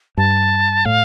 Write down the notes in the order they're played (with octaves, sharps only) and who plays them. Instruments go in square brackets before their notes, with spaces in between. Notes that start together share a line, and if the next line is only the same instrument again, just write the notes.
[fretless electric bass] G2 [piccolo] A5
[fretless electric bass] A2 [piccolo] F5